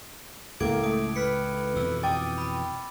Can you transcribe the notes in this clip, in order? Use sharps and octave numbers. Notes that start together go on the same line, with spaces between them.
C#2 A2 A#3 D6 G#6 D7
A3 D#6 D7
B4 F6 B6 C#7
F2 B2 E3 E6
G5 D6 D#6 A6
B5